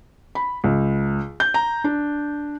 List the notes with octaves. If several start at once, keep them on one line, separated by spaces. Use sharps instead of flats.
B5
C#2
G6
A#5
D4